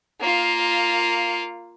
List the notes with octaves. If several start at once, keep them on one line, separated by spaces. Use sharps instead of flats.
A#3 F4